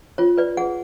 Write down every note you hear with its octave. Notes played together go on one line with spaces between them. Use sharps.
F4 C#5
B4 D5
G#4 F#5